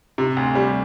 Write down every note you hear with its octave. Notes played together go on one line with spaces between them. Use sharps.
C3
D2
G3